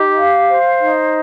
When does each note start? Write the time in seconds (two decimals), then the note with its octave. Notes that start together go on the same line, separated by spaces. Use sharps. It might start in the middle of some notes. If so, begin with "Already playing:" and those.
Already playing: D#4 G4
0.16 F5
0.48 C5
0.79 D#4